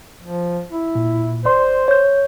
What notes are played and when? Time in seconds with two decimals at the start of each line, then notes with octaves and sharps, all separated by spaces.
0.22 F3
0.71 E4
0.95 A#2
1.45 G1 C5 D5 C6
1.88 C#5 G6